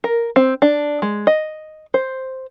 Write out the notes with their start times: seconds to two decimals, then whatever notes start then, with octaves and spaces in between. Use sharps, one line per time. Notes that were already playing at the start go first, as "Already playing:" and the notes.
0.04 A#4
0.36 C4
0.62 D4
1.02 G#3
1.27 D#5
1.94 C5